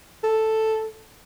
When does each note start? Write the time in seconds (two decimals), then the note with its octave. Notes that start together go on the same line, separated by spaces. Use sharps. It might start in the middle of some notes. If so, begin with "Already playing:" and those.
0.23 A4